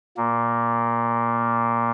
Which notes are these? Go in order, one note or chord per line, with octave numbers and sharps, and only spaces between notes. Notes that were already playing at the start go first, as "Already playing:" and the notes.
A#2 A#3